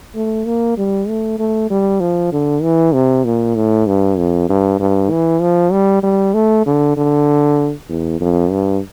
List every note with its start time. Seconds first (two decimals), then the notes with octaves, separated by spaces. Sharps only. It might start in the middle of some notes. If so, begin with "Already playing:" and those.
0.15 A3
0.45 A#3
0.77 G3
1.08 A3
1.38 A3
1.70 G3
2.00 F3
2.32 D3
2.63 E3
2.94 C3
3.25 A#2
3.56 A2
3.87 G2
4.18 F2
4.49 G2
4.80 G2
5.10 E3
5.42 F3
5.72 G3
6.03 G3
6.34 A3
6.66 D3
6.97 D3
7.89 E2
8.20 F2
8.51 G2